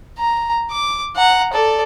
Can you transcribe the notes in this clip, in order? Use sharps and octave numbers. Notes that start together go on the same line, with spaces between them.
A#5
D6
F#5 A#5
A4 D5